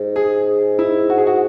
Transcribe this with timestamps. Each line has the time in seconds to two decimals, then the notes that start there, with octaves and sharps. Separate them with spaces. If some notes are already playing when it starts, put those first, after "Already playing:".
Already playing: G#2
0.16 G#4
0.79 E4
1.10 F#4
1.18 G#4
1.27 F#4